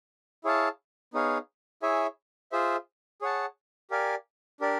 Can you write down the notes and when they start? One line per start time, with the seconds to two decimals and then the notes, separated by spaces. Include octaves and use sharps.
0.44 E4 G#4 C#5 F5 A5
1.14 B3 D#4 G#4 C#5 F5
1.83 E4 G#4 C#5 E5 G#5
2.52 F4 G#4 C5 E5
3.21 G#4 C#5 F#5 A5
3.91 G4 A#4 D5 F5 G#5
4.60 D4 G4 A#4 D5